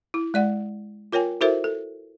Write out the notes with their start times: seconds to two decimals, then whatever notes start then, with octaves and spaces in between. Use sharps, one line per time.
0.14 E4
0.34 G#3 D5 F#5
1.12 F4 A#4 C#5 G5 G#5
1.41 E4 F#4 A4 A#4 C5 E5
1.64 A4